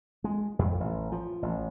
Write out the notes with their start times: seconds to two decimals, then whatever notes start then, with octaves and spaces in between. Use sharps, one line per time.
0.24 G#3
0.59 F2
0.80 A1
1.12 F3
1.43 A1